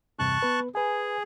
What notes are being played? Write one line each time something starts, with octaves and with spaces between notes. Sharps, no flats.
E2 G2 C3 A5 C#6 F#6
B3 B4
G#4 B4 G#5